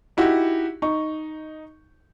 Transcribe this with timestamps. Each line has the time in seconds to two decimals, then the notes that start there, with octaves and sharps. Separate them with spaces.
0.17 D#4 E4 F#4 G4
0.82 D#4 C#6